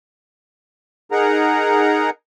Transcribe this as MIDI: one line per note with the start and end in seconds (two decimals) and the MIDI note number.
1.12 2.10 63
1.12 2.10 68
1.12 2.10 70
1.12 2.10 78
1.12 2.10 82